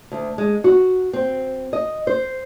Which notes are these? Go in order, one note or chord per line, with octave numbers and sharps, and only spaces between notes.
D2
G#3
F#4
C4
D#5
C5